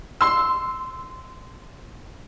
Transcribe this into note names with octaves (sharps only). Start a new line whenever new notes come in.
C6 E6